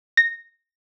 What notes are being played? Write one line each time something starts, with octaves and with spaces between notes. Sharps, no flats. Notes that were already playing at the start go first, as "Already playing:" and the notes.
A#6